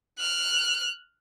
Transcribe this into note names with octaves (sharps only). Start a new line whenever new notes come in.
F6 F#6